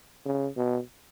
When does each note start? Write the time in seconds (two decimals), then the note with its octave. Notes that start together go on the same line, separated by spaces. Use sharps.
0.26 C#3
0.57 B2